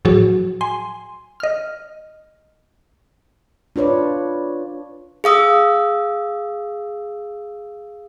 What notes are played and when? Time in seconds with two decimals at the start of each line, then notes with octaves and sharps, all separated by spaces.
0.05 A2 F3 F#3 F#4 G#4
0.61 G#5 C6
1.40 D#5 F6
3.76 D4 F4 B4 C#5 D5
5.24 G#4 F5 D#6 E6